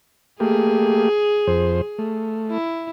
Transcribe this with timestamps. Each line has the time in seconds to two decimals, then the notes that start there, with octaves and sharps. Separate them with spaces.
0.40 A3 A#3 G4 G#4
1.47 F2 C5
1.99 A3
2.50 E4